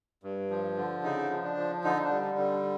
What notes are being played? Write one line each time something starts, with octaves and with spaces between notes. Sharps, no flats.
G2
F3
D3
C#3 D#4
F3
D4
F3
D3 D#4
D4
G3
D3